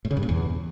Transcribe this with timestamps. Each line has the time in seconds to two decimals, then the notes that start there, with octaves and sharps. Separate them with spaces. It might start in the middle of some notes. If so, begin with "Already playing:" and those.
0.05 A2
0.11 C#3
0.17 G2
0.23 A#2
0.29 E2